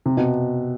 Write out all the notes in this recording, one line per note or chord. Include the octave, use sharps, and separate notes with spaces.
C3
B2